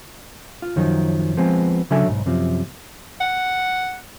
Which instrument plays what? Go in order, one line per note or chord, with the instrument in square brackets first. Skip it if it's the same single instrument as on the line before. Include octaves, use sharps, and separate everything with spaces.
[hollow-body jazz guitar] F4
F#2 D#3 F3 F#3
F3 G#3 B3 C4
C#3 F#3 D4 A4 E5 G#5
B1 G#2
F#2 C3 F3
[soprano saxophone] F#5